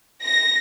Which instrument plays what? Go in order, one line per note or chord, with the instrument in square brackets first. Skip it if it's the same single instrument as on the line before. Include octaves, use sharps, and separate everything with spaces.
[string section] A#6